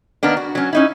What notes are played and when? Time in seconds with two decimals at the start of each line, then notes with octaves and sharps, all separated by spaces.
0.23 D#3 A#3 B3 D4
0.37 F#4
0.55 F#3 C#4
0.73 C#4 D#4 E4